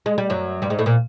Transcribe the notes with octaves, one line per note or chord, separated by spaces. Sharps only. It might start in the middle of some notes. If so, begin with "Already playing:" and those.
G#3
G3
F#2 F#3
G2 G3
G#2 G#3
A2 A3
A#2 A#3